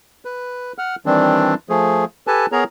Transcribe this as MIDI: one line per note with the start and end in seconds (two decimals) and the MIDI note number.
0.25 0.72 71
0.78 0.95 78
0.78 0.95 89
1.06 1.54 51
1.06 1.54 52
1.06 1.54 55
1.06 1.54 60
1.06 1.54 62
1.69 2.05 53
1.69 2.05 57
1.69 2.05 68
2.27 2.46 67
2.27 2.46 69
2.27 2.46 71
2.27 2.46 80
2.27 2.46 81
2.52 2.64 59
2.52 2.64 68
2.52 2.64 70
2.52 2.64 73
2.52 2.64 82